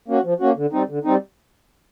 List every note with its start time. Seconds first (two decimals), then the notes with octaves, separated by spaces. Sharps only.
0.08 A#3 C#4 F#4
0.24 F3
0.40 A#3 C#4 F#4
0.56 D3
0.72 G3 C4 D#4
0.89 D3
1.04 G3 C4 D#4